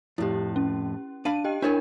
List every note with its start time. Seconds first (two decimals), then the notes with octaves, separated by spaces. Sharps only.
0.18 F2 A2 E4 G4
0.56 C#4
1.25 D4 F5 B5 D#7
1.44 G4 D#5 G5
1.62 D4 E4 A#4 C#5 G#5